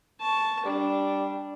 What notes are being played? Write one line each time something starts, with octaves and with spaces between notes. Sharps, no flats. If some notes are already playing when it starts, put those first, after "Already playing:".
A5 C#6
G3 D4